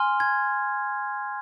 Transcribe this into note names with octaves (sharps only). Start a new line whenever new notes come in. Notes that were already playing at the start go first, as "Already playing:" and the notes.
Already playing: G#5 C6 F6
G#6